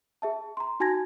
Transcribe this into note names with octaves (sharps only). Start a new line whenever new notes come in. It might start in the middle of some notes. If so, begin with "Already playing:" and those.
G#4 E5 A5
A#5 C6
D#4 F#4 G#5 A5 G#6 A#6